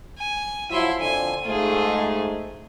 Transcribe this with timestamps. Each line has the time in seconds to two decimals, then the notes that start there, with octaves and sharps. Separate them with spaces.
0.19 G#5
0.71 F3 F#3 E4 E5 C6
1.00 F2 D3 G#5
1.46 G#2 A3 F4 G#4